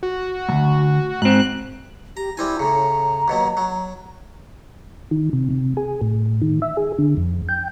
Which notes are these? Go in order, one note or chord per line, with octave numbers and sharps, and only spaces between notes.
F#4
D2 G#2
G#2 C4 F#6
G4 A#5
G3 C4 E4 G#5
A2 C#3 A#5
D#2 B2 F#3
F#3
D#3
C3
C3
G#4
A2
D#3
E5
G#4
D3
F2
G5